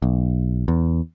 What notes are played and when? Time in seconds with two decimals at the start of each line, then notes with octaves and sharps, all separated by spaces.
0.02 B1
0.68 E2